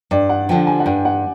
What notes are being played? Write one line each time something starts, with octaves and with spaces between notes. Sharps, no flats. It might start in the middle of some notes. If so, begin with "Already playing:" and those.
G2 D5
F#5
D3 F3 G5
G#5
F#5
G2 G5
F#5